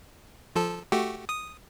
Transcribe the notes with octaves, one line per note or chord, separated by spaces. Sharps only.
F3 A4
A3 F#4 G4
D#6